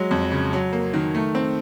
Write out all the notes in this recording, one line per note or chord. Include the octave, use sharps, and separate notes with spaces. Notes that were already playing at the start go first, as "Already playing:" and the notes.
Already playing: F#3 G#3
F2
C#3
F#3
A#3
D#3
A3
C4